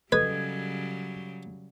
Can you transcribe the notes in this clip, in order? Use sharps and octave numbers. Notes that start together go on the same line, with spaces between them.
C#3 F#3 G3 A4 B4 D#5 G#6